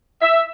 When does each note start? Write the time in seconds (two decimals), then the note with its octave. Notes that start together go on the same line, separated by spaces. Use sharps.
0.22 E5